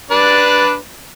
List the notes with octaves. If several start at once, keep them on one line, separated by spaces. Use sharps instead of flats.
D4 B4 D5